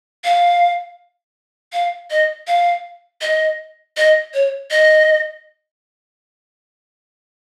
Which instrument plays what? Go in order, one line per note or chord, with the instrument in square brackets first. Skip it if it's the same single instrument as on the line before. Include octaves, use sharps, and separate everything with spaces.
[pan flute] F5
F5
D#5
F5
D#5
D#5
C#5
D#5